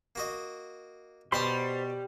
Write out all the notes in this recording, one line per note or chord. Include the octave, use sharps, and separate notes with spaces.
A#3 F#4 D#5
B2 G3 C5 F#5 A5 B5 C6